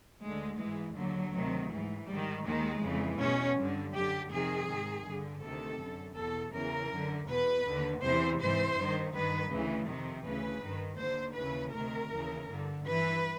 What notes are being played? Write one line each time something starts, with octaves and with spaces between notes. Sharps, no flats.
D2 D3 G#3
G#2 E3 G#3
D#2 D3 F#3
D2 C3 D#3
G#2 E3
G#2 D#3 G3
D#2 D#3 G#3
F2 C#3 E3
E2 B2 C#4
G2 D3
F#2 D3 G4
F2 C3 D#3 G#4
G#2 D#3
G2 D3
D2 C3 D#3 A4
F#2 D3
E2 B2 A4
E2 C#3 E3 A#4
F#2 D3
E2 B2 B4
D#2 D3
E2 C3 E3 C5
G#2 E3 C5
G2 D#3
G2 D#3 B4
D2 C#3 E3
F2 C3 D#3
D2 C#3 E3 B4
G2 D#3
D#2 D3 C5
D#2 C#3 E3 B4
D2 C3 D#3 A#4
D#2 C#3 E3
G2 D3
G2 E3 B4